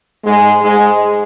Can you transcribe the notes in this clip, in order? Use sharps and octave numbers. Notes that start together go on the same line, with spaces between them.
G#2 G#3
G#2 G#3